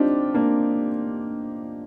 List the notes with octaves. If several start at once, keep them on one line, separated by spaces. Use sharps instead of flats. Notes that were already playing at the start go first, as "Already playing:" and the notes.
Already playing: C4 D4 D#4 F4 G4
A#3 D4